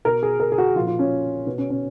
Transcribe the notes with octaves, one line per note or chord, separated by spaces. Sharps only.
B2 A#4
G#4
A#4
G#4
F#4
F3 F4
A#2
F4
C#4
B2 B3
C#4
C#4